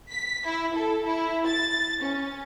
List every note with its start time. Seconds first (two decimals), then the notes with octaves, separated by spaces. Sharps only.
0.11 B6
0.45 E4
0.75 A4
1.05 E4
1.45 A6
2.01 C#4